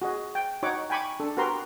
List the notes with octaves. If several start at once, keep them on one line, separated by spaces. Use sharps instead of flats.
F#4 G#4 D#5
G5
D#4 F#4 C#5 F#5 D6
G5 G#5 B5 C#6 D6
D4 A4
F#4 G4 A#4 B4 A#5 C6